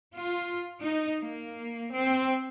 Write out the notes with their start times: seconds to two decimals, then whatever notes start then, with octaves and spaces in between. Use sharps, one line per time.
0.16 F4
0.80 D#4
1.21 A#3
1.93 C4